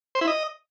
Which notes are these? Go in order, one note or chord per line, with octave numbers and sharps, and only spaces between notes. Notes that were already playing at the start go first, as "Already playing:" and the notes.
C5
E4
D#5